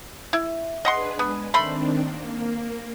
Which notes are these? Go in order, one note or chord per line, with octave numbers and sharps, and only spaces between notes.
E4
D4 G#4 B4 D#5 F#5 C6
G#3 B3
D#3 A3 C4 D4 B5 C6
A#3